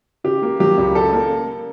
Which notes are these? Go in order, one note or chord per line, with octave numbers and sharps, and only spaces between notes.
C#3 G4
A#3
F#3 G4
C#2
C#3 A4
A#3